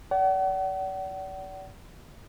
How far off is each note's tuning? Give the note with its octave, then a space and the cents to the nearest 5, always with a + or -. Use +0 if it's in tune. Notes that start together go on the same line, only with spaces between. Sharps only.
D5 -35 F#5 +40